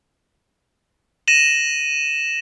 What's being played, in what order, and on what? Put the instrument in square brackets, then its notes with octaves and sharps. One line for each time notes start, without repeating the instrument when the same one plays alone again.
[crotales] A#6 D#7 E7 F#7